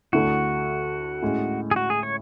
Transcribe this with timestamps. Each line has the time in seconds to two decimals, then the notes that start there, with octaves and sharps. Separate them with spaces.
0.13 D2 D3 A3 E4 F#4
1.22 A2 G#3 C#4
1.71 G#4
1.76 F#4
1.90 G#4
2.03 C#5